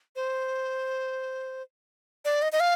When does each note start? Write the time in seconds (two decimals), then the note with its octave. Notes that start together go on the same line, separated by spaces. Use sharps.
0.16 C5
2.25 D5
2.42 D#5
2.52 D#5
2.60 F5